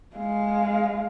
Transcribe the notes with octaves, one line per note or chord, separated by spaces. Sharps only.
G#3 F5